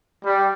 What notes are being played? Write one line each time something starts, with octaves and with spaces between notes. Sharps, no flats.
G3